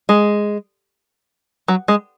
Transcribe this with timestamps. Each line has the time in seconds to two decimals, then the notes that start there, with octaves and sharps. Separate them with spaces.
0.09 G#3
1.68 F#3
1.88 G#3